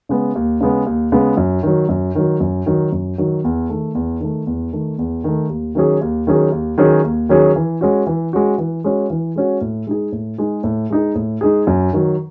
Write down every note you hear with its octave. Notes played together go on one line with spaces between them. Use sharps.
C#3 G#3 B3
D#2
C#3 G#3 B3
D#2
C#3 G#3 B3
F#2
D#3 F#3
F#2
D#3 F#3
F#2
D#3 F#3
F#2
D#3 F#3
E2
D#3 A3
E2
D#3 A3
E2
D#3 A3
E2
D#3 A3
D#2
D#3 F#3 C#4 G#4
D#2
D#3 F#3 C#4 G#4
D#2
D#3 F#3 C#4 G#4
D#2
D#3 F#3 C#4 G#4
E3
G#3 C#4 F#4
E3
G#3 C#4 F#4
E3
G#3 C#4 F#4
E3
G#3 C#4 F#4
A2
G#3 D#4 G#4
A2
G#3 D#4 G#4
A2
G#3 D#4 G#4
A2
G#3 D#4 G#4
F#2
D#3 F#3